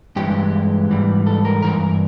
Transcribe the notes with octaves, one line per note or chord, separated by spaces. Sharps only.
G2 E3 G#3 G4
G#2 E3 G3
A4
A#4
G2 E3 A#4